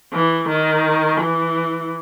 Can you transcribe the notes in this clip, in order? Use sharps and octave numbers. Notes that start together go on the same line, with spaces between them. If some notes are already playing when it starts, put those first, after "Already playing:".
E3
D#3
E3